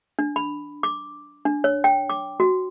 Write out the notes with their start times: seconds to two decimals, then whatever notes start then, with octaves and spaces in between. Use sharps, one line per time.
0.19 D4
0.36 B5
0.83 D6
1.45 D4
1.64 C#5
1.84 G5
2.10 D6
2.40 F#4